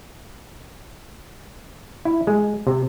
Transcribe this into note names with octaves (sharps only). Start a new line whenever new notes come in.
E4
G#3
C3